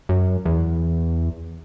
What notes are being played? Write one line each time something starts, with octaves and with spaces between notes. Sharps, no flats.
F#2
E2